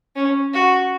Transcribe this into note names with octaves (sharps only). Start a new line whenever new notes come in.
C#4
F#4